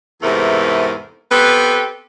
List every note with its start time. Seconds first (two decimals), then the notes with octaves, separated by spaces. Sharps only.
0.22 E2 G#2 C3 A3 A#4 B4
1.30 B3 C4 G4 A4 B4